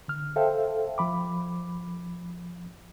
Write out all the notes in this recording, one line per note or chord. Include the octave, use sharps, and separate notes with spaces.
D3 F6
A4 C5 E5 F5 G5
F3 B5 D6